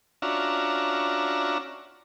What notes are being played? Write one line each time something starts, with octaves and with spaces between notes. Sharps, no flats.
C#4 D4 F4 F#4 E5 A#5